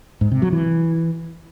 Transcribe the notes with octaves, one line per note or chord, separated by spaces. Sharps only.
G#2
C3
F#3
E3